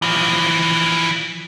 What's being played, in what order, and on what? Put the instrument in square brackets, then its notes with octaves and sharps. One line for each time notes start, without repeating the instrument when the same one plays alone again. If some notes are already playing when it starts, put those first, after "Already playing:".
[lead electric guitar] E3 F3